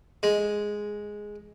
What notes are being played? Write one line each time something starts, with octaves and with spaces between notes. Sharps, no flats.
G#3